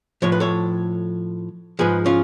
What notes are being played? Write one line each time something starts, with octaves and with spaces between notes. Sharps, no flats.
A2 F3 C#5
B4
A4 C#5
G#2 F3 G#4 B4
C#4 F4